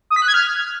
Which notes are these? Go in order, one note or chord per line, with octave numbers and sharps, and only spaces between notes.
D#6
B6
F#6
G#6
F6